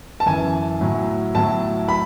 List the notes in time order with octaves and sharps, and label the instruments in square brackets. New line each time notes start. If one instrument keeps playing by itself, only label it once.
[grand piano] A5
F#2 E3 G#5
A2 F#3
A2 F#3 A5
B5